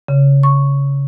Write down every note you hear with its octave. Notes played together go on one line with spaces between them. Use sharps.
C#3
C#6